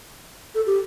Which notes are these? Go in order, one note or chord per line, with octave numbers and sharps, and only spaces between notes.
A4
G4